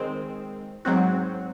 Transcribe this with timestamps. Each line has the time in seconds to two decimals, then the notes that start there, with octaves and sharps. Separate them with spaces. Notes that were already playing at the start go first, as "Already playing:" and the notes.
Already playing: D#3 G#3 C4
0.85 G#2 F#3 C4 F#4